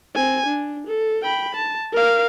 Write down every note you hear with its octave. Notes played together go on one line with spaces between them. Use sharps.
C4 G#5
D4
A4
G5 B5
A5
A#4 F5